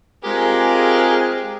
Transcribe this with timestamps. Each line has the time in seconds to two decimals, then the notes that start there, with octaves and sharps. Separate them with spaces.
0.24 G#3 C4 F4 G4 G#4 A#4